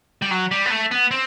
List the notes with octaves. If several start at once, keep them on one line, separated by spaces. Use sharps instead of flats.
G3
F#3
G3
B3
A3
B3
C4